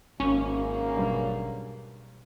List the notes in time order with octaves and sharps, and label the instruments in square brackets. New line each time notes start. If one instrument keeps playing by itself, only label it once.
[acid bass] G#1 [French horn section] F#2 C#3 A#3 [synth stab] C#4 [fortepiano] C#6
[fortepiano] B1 G2 G3